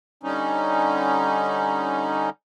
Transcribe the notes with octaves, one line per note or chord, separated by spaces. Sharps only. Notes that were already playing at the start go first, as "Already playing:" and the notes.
D3 G3 C#4 D#4